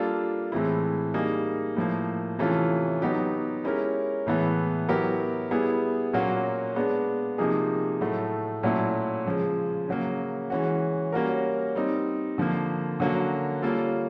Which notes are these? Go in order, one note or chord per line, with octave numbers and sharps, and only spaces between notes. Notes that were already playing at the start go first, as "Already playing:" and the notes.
Already playing: G3 A#3 D4 F4 A4
A2 E3 G#3 C4 E4
G3 A#3 D#4 G#4
A2 F3 A#3
C3 E3 A3 C#4 F4
F#3 B3 D#4 G4
G#3 C#4 E4 G4 A#4
A2 E3 G#3 B3
F#3 B3 E4 G4 A#4
G3 B3 E4 G#4
A#2 F#3 A#3 C#4 F#4
G#3 B3 D4
C3 F3 A#3 D#4 G#4
A2 F#3 A3
A#2 F#3 A3 C#4 E4
C#3 F3 G#3
C#3 F#3 A#3
E3 G#3 C#4 F#4
G3 A#3 C#4 F#4 A#4
G3 C4 D#4
D3 F3 A#3
D3 F#3 A#3 C#4 F#4
G3 A#3 C#4 F4 A4